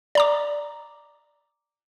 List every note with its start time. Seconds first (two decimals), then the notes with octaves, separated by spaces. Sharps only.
0.15 D5 A#5 D6